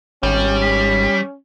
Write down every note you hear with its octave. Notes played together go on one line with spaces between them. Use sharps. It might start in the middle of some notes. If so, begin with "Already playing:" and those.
G#1 G3 C#4
B6